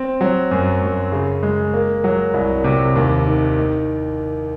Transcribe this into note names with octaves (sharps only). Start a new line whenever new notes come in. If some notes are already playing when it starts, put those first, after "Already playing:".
Already playing: C4
F#3
F#2
F#2
C#3
G#3
A#3
F#3
C2
C3
D#2
D#3
D#3